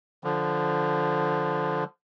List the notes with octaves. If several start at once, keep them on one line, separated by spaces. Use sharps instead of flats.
D3 F3